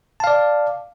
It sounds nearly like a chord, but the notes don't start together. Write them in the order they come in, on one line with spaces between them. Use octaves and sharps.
A5 F5 D5